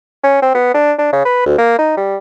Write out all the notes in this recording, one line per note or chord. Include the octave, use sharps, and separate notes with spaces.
C#4
C4
B3
D4
D4
C#3
B4
D2
A#3
D#4
G3